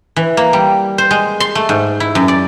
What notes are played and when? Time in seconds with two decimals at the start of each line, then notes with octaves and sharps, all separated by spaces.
0.16 E3
0.37 A#3
0.53 G3
0.98 C5
1.11 G#3
1.40 C6
1.55 A3
1.69 G#2
2.00 E4
2.15 F#2
2.28 D5